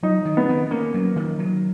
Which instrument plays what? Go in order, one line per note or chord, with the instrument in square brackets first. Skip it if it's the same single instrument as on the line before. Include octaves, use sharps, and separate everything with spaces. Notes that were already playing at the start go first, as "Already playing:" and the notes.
[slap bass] F#3 [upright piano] D#4
[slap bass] D#3
[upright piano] B3
[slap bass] D#3
[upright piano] A#3 [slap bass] C#4
[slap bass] F#3
D#3
F#3